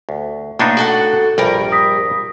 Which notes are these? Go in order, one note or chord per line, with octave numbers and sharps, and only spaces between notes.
D2
A2 A#3 B3 D4 D#4
F#4 A4 F#5
A#1 G2 G3 A#4
D#6 A#6 B6